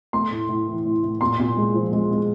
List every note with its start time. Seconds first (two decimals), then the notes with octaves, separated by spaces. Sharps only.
0.13 A3 C6
0.31 A2
0.49 A2
0.67 E3
0.85 A2
1.03 A2
1.21 A#2 C6
1.39 A#2
1.57 G#3
1.74 F3
1.92 G#3
2.11 G#3